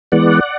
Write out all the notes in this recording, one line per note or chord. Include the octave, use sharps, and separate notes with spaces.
E3 G#3 B3 D5 F#5